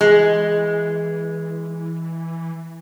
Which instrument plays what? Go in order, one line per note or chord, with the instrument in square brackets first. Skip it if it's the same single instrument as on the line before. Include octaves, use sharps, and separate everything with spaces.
[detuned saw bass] E3 [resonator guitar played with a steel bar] G#3